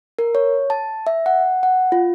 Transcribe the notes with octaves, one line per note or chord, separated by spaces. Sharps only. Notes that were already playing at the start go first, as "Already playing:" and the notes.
A#4
C#5
A5
E5
F#5
F#5
F4